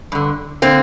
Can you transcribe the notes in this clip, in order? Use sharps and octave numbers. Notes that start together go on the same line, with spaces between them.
G2 D3
D3 A#3 C4